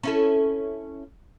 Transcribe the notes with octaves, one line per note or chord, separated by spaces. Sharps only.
C#4 E4 A4